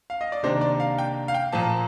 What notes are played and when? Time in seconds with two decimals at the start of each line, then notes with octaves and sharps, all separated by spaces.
0.10 F5
0.21 D#5
0.32 D5
0.43 C3 D#3 A#3 D4 C5
0.61 D5
0.80 F5
0.98 G5
1.28 F5
1.34 G5
1.52 A#2 F3 A#3 A5